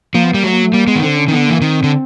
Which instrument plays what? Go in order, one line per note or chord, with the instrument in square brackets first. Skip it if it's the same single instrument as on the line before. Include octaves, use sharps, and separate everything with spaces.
[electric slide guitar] F3 [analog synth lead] A#3
[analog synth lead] B3
[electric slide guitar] G3 [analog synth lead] A#3
[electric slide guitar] F#3 [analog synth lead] A3
[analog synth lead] A#3
A3
[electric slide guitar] G3 [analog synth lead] A#3
[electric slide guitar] G#3 [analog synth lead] B3
[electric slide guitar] D#3
[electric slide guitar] D3 [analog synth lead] C4
[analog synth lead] C#4
[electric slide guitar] D#3
[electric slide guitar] D3 [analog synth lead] B3
[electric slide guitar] E3 [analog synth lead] A#3
[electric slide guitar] D#3 [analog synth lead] C4
[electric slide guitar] D3